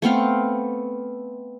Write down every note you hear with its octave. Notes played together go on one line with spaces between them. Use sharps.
A3 B3 C4 F5